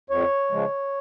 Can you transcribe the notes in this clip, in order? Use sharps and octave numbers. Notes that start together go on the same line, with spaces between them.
F2 C#5
C#3 F3 G#3